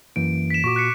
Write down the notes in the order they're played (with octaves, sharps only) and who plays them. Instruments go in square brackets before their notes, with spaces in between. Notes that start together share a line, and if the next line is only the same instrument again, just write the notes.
[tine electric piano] F#2 E3 A#3 [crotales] D7
[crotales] B6 E7
[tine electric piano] A#2 F#4 [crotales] C#6 D6
[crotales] F#6 B6 C#7